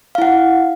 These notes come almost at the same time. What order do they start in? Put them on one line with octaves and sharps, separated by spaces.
F5 E4 F#5